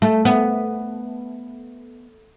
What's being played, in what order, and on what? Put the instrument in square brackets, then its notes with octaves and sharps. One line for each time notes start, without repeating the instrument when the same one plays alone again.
[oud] A3
B3